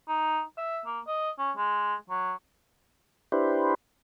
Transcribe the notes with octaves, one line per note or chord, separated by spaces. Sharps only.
D#4
E5
A#3
D#5
C#4
G#3
F#3
D4 E4 G4 B4 C5